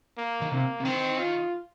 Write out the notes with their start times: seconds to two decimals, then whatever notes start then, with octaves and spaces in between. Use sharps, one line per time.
0.17 A#3
0.42 D#3
0.51 C3 A#3
0.81 C3
0.85 D#3 C4
1.19 F4